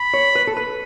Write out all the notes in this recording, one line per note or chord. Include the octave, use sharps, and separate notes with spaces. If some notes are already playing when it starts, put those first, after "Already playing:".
Already playing: B5
C#5
B4
A4
B4